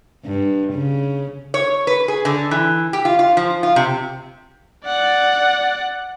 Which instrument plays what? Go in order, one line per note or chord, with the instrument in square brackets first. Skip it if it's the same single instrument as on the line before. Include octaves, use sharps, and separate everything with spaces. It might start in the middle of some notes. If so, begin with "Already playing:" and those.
[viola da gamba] G2
C#3
[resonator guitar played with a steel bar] C#5
B4
G#4
D3
E3
G4
F4
F4
F3
F4
C3
[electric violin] D5 F#5